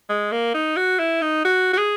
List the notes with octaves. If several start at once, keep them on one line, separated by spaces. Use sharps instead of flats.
G#3
A#3
D#4
F#4
E4
D#4
F#4
F#4
G#4